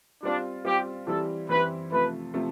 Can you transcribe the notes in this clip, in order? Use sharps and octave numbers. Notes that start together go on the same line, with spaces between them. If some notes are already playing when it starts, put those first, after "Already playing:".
G3 C4 D4 F4
G3 C4 F4 G4
E3 G3 C4 E4 G4 A4
E3 G3 C4 E4 G4 B4
C3 F3 A3 B4
C3 F3 A3